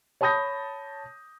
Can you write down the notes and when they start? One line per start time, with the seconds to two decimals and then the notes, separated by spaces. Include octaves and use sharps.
0.21 C#5 A5 B5 D#6 G6 A#6